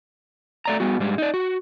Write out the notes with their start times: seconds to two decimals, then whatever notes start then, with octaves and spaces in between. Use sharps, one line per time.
0.65 A3 D5 A#5
0.80 G3 B3 F#4
0.99 G#2 G3 G#3
1.18 D#4 D5
1.34 F#4